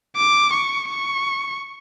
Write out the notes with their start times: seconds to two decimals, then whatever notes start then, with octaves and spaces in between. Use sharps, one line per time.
0.17 D6
0.53 C#6
0.89 C#6